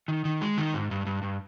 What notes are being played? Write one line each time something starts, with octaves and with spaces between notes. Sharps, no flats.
D#3
D#3
G#3
D#3
G#2
G2
G2
G2